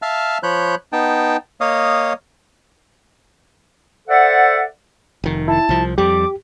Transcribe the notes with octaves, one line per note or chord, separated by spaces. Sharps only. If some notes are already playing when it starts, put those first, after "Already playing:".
E5 F5 A5 F6
F3 C#5 B5 F#6 G6
B3 D#4 G5 A5
A#3 C#5 D#5 F5 D#6
A4 C5 D5 E5 F#5
F1 D#3
E4 A5
C2 F3
F2 G3 G4 D6